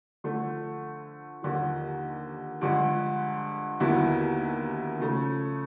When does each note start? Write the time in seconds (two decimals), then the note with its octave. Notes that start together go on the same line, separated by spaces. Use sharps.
0.24 D3 F3 A3
1.42 D#2 D3 F3
2.61 G2 D3 F3 G#3
3.80 D#2 D3 F#3 B3 E4
4.99 C#3 F3 A3